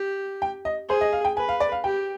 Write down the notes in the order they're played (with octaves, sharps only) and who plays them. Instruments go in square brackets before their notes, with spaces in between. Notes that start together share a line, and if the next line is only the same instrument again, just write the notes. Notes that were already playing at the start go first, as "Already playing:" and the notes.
Already playing: [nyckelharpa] G4
[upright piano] G5
D#5
[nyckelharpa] G#4 [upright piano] C5
[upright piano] D#5
F5
G5
[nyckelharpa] B4 [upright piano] G#5
[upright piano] F5
D5
F5
[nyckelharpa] G4 [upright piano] G5